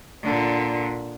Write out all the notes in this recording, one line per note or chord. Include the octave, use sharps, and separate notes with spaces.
A#2 D3